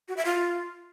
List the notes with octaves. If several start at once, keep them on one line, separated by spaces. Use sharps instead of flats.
F#4
E5
F4